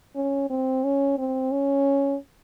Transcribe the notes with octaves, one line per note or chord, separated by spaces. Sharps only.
C#4
C4
C#4
C4
C#4